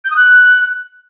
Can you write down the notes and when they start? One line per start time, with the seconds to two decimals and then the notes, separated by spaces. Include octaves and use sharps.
0.05 G6
0.10 D#6
0.16 F#6